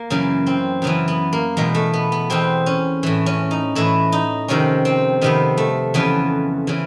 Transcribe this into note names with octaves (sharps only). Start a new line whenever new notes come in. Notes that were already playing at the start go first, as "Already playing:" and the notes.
Already playing: A#3
F#2 C#3 E3
C4
F#2 C#3 E3 B3
B3
A#3
E2 B2 G#3
A3
B3
B3
E2 B2 C4
C#4
A2 E3
C#4
D#4
A2 E3 E4
D#4
F2 C3 D#3 C#4
C4
F2 C3 D#3 B3
A3
F2 C#3 E3 B3
C#3 E3